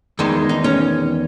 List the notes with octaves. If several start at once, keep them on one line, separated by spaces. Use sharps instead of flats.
E2 D#3 G#3
D#4
C#4